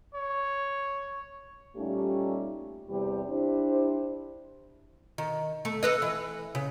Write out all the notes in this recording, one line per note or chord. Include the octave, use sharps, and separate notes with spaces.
C#5
A#2 G3 A3 C#4 D#4 G4
E2 C3 G3 G4
D4 E4 G4 C5
D#3
A3
A4 B4 D#5
E3
C#3